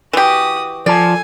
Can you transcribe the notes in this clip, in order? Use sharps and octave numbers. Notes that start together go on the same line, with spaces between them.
E3 F#4 G4 D#6
F3 F4 A4 D5 G#5 A5